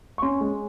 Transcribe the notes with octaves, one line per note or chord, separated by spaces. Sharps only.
C#6
C#4 C6
G#3